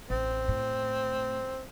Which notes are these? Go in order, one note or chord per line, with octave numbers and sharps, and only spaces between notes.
A1 C4
A2